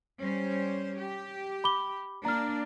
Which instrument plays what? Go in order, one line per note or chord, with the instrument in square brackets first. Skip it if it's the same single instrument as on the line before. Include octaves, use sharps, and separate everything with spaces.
[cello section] G3 C#4 C5
G4
[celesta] B5 D6 G7
[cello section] A#3 D4 [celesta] A#5 F6